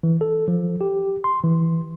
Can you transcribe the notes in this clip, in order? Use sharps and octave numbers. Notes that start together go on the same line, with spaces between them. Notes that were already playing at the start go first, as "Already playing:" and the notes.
E3
A4
F3
G4
C6
E3